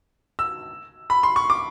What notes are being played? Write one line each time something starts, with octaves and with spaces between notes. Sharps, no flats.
E6
B5
C6
C#6
D6